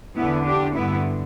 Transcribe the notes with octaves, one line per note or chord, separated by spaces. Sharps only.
E2 D3 B3 E4
D4 G4
G2 D3 B3 E4